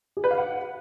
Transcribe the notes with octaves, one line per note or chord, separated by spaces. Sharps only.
G#4
B4
F5
F#5